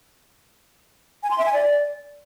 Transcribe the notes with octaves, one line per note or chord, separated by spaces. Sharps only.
G#5
C6
E5
G#5
D5